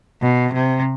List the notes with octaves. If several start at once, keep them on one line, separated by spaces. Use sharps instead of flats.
B2
C3